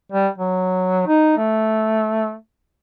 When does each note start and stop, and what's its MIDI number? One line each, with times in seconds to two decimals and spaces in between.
0.12 0.28 55
0.38 1.05 54
1.07 1.36 63
1.37 2.34 57